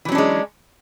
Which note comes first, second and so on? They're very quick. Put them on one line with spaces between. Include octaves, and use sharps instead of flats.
E3 F#3 C#4 D4 G#3